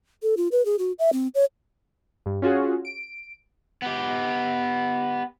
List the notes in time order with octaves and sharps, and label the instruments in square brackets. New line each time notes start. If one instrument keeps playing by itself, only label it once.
[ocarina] A4
F4
B4
G#4
F#4
E5
C4
C#5
[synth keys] G2
C#4 F4 F#4 G#4
D7
[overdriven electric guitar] B3 G4